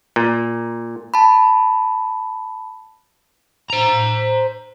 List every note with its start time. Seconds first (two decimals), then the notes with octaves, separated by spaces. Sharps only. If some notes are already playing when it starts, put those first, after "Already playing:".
0.16 A#2
1.14 A5 B5
3.70 C5 A#5